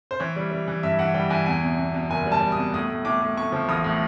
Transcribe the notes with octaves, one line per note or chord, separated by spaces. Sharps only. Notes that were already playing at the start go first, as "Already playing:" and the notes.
C5
E3 C#5
G3
G3
E3
G2 E5
E3 F#5
G3 G5
E3 G#5
E2 G#5
B2
B2
B2
F#1 G#5
G3
A5
G3
D#6
B2
A2 D#6
A2
A2 D6
A2
A3 C#6
F3
A1 D#6
A2